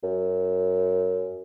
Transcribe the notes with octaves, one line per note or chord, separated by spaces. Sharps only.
F#2